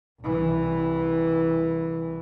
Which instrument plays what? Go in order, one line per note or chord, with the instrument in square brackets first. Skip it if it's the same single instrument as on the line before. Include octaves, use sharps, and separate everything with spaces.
[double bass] C2 E3